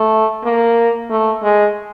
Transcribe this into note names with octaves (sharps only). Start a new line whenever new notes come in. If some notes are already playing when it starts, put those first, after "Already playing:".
Already playing: A3
A#3
A3
G#3